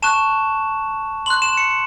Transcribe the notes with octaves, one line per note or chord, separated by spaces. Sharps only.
A5 C#6 F#6 E7
C6 F#6 F#7
E7
C#7